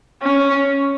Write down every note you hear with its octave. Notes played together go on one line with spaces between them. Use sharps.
C#4